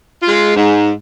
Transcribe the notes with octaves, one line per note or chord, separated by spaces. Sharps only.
G#3 F4
G#2